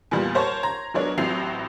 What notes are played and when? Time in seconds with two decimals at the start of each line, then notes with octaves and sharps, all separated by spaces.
0.11 E2 A#2 F3 G3
0.34 A#4 C5 C#5 A5 C#6
0.63 A#5 C6 G#6
0.94 F#3 G#3 B3 D4 A#4 C#5
1.18 A1 A2 F#3 C4 C7 F7